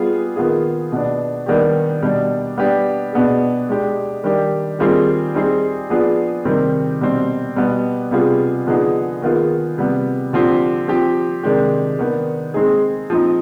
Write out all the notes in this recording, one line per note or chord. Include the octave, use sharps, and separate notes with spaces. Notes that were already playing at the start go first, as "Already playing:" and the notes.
Already playing: G3 B3 F4 G#4
D#3 B3 F4 G#4
B2 B3 D4
D#3 G3 B3 D4 G4
B2 G3 D4
G3 B3 D4 G4
B2 B3 D4 G#4
G#3 D4 G4
D#3 G3 D4 G4
D#3 G3 C4 F4 G#4
G3 C4 D#4 G#4
F3 B3 D4 G#4
C3 D#3 G3 C4 G4
B2 G3 C4
B2 G3 B3
C3 G3 B3 F4 G#4
D3 F3 B3 D#4 G#4
D#3 B3 F4 G#4
C3 G3 B3
D3 F3 C4 G4
F3 C4 G4
C3 D#3 G#3 D4 G4
D#3 B3 D4
G#3 C4 D#4 G#4
F3 C4 D#4